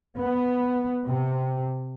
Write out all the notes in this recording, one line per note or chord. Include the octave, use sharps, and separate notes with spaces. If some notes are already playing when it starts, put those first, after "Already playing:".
B3
C3